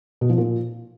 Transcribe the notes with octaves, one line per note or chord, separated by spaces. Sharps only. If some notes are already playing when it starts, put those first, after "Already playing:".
B2
F3
A#2